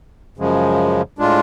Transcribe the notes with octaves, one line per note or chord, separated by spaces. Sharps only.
F#2 C#3 F3 G#3
A2 G#3 D4 F4